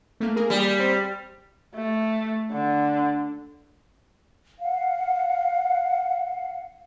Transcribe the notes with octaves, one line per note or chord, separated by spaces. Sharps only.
A3 A#3
A#3 G#4 A#4
G3
C4
A3
D3
F5 F#5